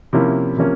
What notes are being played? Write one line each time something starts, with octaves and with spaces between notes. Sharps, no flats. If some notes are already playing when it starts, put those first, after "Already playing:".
C3 F3 A#3 C#4 E4
C3 F3 A#3 C#4